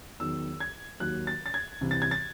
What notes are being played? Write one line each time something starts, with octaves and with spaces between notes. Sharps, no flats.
E2 D#3 F#3 E6
G#6
D#2 D#3 F#3 F#6
A6
A6
G#6
C2 C3 E3
A6
G#6
A6